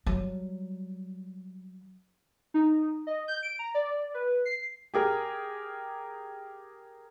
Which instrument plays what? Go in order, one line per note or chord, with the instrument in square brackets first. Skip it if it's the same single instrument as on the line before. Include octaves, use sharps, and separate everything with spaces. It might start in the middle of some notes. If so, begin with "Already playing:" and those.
[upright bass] F#3 G3
[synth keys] D#4
D#5
G6
D7
A#5
D5
B4
C7
[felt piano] G4 G#4 A#4